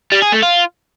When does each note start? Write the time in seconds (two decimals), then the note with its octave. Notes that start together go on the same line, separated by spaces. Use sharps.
0.12 G3
0.22 G#4
0.33 A3
0.43 F4